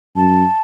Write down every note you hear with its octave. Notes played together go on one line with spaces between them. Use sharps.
F#2 A5